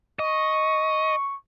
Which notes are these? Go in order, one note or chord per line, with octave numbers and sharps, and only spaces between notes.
D#5 C#6